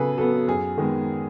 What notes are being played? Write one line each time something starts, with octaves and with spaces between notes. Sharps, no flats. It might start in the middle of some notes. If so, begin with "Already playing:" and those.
Already playing: C#3 F#3 B3 G#4 A4 B4
F#3 B3 A4
F#2 G#4
D#3 G#3 B3